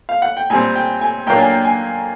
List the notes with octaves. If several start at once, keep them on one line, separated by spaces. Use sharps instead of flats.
F5
F#5
G5
A#2 G3 C4 G#5
G5
G#5
A#2 F#3 A#3 D4 G5
G#5
G5
G#5